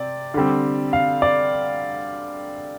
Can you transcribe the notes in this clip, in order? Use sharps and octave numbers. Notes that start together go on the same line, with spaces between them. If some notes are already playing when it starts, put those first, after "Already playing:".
Already playing: C3 C4 D5
D3 G3 C4
F5
D5